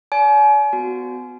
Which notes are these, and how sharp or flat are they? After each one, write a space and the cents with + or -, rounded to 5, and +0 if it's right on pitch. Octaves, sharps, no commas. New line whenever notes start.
D5 -40 G#5 +40
B3 +30 F#4 +0